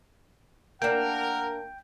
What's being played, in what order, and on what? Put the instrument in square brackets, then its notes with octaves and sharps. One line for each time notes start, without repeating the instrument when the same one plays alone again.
[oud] A#3 D4 [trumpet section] A#4 [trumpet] F#5 [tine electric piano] G5